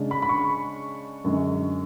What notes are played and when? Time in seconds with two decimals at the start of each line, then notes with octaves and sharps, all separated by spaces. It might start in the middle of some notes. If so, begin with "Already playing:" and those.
Already playing: C#3 G#3 D4
0.11 B5
0.22 B5
0.29 C#6
1.24 F#2 D3 G#3